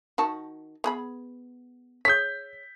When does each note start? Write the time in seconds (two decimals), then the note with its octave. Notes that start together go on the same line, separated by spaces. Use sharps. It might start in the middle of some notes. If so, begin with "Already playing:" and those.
0.18 D#3 F#4 A5
0.84 B3 G#4 B5
2.05 G#4 C#5 G6 B6